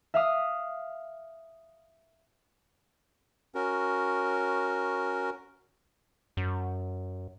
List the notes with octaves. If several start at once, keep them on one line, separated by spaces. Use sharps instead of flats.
E5 F5 D#6
C#4 F#4 A#4
F#2